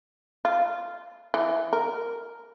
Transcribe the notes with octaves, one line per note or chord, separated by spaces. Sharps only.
F4
E3
A#4